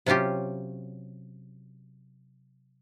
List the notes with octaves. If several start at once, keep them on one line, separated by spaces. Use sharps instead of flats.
C3 F#3 C#4 F4 G4